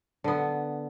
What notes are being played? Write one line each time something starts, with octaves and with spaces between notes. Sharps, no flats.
D3 B3